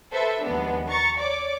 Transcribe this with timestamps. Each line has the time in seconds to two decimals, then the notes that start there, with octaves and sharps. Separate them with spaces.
0.11 A4 B4 C5 E5
0.42 D#2 F3 G#3 B3 D4
0.88 A#5 C#6 A6
1.20 C#5 D5 D6